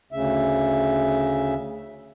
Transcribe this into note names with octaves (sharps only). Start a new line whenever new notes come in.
D2 C#3 E5